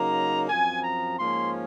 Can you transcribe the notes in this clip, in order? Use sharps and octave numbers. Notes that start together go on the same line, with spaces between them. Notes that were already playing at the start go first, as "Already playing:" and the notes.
Already playing: C#3 F#3 A#3 D#4 A#5
F#2 F3 C4 G#5
A#5
G#2 F3 A#3 C#4 C6